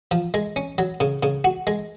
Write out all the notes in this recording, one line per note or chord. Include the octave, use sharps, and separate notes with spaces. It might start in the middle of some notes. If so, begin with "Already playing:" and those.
F3
G#3
C#4
F#3
C#3
C#3
F#4
G#3